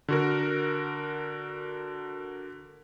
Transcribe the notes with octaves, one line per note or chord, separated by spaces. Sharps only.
D3 F#4 A#4